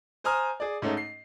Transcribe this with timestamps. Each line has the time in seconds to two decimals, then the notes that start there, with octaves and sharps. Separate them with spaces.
0.24 C5 G#5 A#5 D#6 F6
0.60 G#4 D5
0.82 G#2 A3 C#4 D#4
0.97 C7